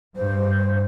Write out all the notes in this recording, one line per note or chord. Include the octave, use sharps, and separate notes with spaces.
G2 C5